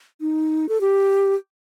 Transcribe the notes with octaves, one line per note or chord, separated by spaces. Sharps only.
D#4
A4
G4